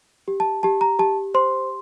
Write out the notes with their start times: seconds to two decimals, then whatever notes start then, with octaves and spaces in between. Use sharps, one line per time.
0.28 G4
0.40 A5
0.63 G4 A5
0.81 A#5
0.99 G4 A5
1.34 C5 C6